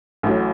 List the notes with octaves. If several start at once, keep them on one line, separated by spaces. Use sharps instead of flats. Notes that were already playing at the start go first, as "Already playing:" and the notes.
A1 A2 F#3 C#4